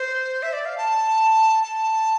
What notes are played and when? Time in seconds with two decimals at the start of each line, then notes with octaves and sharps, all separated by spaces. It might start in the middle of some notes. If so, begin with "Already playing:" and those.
Already playing: C5
0.43 E5
0.53 D5
0.65 F5
0.77 A5
1.63 A5